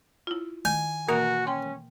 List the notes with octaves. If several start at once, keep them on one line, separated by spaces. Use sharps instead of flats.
E4 F4
D#3 G#5
B2 E3 A#3 F#4 A#4
C#4 G5 C6